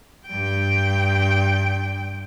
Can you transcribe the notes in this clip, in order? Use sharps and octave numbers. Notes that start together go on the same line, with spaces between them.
G2 G5